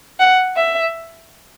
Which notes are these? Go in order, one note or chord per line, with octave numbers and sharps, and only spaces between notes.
F#5
E5